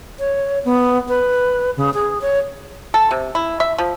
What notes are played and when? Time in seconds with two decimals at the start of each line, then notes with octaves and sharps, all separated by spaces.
0.19 C#5
0.65 B3
1.09 B4
1.77 C#3
1.94 G#4
2.21 C#5
2.94 A4
3.11 C3
3.35 E4
3.60 E5
3.78 F3